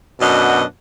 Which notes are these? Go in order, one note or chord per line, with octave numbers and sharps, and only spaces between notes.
F#2 B2 D4 D#5 F#5